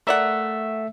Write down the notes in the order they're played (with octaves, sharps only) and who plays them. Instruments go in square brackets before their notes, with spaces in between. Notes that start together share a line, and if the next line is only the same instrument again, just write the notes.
[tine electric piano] A3 E5 E6 [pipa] A#4 D5 F#5